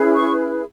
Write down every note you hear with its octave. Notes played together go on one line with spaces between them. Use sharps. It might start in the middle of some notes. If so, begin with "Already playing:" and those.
Already playing: C#4 E4 G#4 B4
C#6